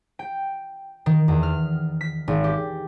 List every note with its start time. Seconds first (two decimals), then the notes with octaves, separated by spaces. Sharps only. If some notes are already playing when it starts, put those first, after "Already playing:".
0.19 G5
1.06 D#3
1.28 E2
1.43 F6
2.01 B6
2.28 G#1
2.44 G4